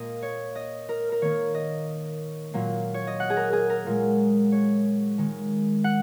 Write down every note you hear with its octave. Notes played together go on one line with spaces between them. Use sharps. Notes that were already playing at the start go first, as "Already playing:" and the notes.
Already playing: A#2 A#3 D#5
C#5
D#5
A#4
A#4
D#3 A#3 C#5
D#5
A#2 F#3 A#3
C#5
D#5
F#5
G#4
A#4
G#4
A#4
A#2 G#3
C#5
D#3 G#3
F#5